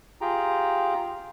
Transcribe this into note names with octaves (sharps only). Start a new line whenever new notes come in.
F4 G4 G#4 G5 A#5